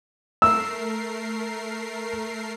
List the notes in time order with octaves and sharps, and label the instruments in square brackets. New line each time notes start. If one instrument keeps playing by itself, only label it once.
[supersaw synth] A3 A#4 C7 [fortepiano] E6